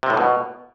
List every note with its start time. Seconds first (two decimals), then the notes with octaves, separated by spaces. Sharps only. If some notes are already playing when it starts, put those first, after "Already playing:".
0.03 C3
0.10 A2
0.17 B2